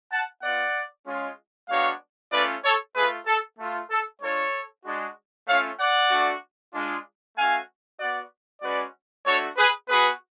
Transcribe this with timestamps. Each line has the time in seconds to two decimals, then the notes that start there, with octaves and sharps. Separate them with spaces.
0.12 F#5 A5
0.43 B3 F4 D5 F#5
1.06 G#3 C#4 F4
1.69 G#3 B3 D4 F#4 C#5 F5
2.33 A3 C#4 F4 B4 D5
2.64 A4 C#5
2.95 A3 F4 G#4 B4
3.27 A4
3.59 A3 F4
3.90 A4
4.22 G#3 D4 F4 A4 C#5
4.85 G#3 D4 F#4
5.47 A3 C#4 F4 C#5 F5
5.80 D5 F#5
6.11 A3 D4 F#4
6.74 G#3 D4 F4
7.37 A3 C#4 F#4 F5 G#5
8.00 B3 F#4 D5 F#5
8.62 G#3 C#4 F#4 B4 D5
9.26 A3 D4 F#4 A4 C#5
9.57 G#4 B4
9.89 B3 F#4 G#4 B4